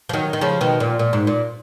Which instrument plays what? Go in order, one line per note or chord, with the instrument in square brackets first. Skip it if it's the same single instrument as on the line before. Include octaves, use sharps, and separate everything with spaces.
[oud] F3
D#3 F#3
D#3
C#3 F3
B2 D#3
A#2
A#2
G#2
A#2